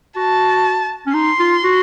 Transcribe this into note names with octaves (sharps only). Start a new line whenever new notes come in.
F#4 A5
C#4
D#4 C6
F4
F#4